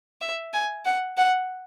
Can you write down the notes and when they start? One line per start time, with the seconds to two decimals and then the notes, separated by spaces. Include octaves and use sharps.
0.21 E5
0.53 G#5
0.85 F#5
1.17 F#5